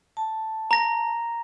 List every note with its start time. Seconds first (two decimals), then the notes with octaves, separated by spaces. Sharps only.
0.17 A5
0.71 A#5 A#6